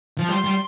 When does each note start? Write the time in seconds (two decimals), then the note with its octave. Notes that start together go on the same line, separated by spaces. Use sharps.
0.18 F3
0.29 G3 C6
0.45 G3